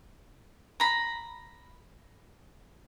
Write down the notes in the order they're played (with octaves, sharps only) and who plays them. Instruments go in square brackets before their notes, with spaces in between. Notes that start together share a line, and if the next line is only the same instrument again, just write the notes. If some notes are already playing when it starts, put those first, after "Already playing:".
[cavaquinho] A#5 B5